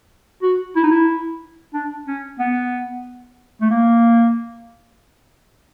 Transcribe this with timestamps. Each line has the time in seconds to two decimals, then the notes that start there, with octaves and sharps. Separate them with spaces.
0.43 F#4
0.76 E4
0.83 D#4
0.91 E4
1.74 D4
2.07 C#4
2.39 B3
3.61 A3
3.71 A#3